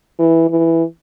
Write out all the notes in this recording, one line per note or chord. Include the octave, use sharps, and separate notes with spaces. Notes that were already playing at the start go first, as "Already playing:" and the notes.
E3
E3